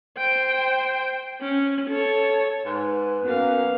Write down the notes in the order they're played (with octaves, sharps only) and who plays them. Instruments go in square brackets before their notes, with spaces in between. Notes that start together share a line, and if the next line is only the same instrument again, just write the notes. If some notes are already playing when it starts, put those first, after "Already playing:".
[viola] C5 G5
C#4
A4 C#5
[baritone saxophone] G#2 [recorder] B4
[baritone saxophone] F#2 [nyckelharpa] A#3 F5 [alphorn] B3